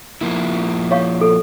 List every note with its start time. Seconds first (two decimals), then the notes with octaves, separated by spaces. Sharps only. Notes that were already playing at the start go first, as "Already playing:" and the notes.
0.21 F3 A#3 E4
0.91 C#5 F5 C#6
1.21 A4